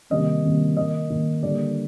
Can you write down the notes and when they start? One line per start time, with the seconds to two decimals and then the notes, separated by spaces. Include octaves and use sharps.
0.10 C3 D#3 G3 A#3 D#5
0.43 C3 D#3 G3 A#3
0.77 D#3 A#3 D#5
1.10 D#3 A#3
1.42 D3 G3 A#3 D5